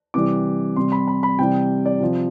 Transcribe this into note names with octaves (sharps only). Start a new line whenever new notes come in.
C3 E3 G3 D6
C3 G3 C6
B5
B5
B5
C3 E3 G3 G5
D5
C3 F3